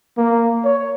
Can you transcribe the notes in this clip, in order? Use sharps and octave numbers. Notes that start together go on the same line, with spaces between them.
A#3
C#5